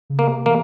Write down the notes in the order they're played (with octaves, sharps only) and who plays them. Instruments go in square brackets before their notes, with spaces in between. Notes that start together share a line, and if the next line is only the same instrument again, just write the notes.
[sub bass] C#3
[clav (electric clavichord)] A#3
[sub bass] C3
[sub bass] E3 [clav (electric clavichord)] A#3